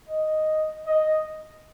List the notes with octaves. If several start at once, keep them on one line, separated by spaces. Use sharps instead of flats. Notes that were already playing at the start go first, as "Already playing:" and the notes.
D#5
D#5